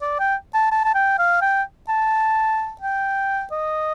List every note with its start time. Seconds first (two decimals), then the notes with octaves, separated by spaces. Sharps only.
0.02 D5
0.19 G5
0.54 A5
0.72 A5
0.84 A5
0.95 G5
1.19 F5
1.41 G5
1.89 A5
2.81 G5
3.51 D#5